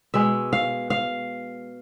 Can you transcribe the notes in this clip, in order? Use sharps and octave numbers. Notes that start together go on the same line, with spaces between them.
B2 G#3 E5
F5
F5